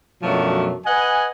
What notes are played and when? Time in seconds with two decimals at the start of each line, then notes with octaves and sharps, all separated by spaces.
0.23 F#2 B2 F3 F#3 A3 D4
0.86 B4 D#5 F#5 G#5